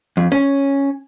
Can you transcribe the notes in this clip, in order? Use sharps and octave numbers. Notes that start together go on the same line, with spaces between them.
F2
C#4